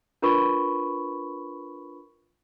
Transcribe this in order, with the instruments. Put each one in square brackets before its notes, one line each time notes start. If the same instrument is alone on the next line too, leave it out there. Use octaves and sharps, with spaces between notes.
[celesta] D4 F4 A#4 B4 B5 C#6